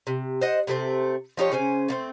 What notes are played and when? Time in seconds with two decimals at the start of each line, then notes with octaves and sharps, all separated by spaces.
0.07 C3
0.41 C5 D#5 F#5
0.67 C3 G#3 A3 C4
1.37 F3 D#4 G4 C#5
1.52 C#3 C#4 C5 G#5
1.88 A3 A#3 C4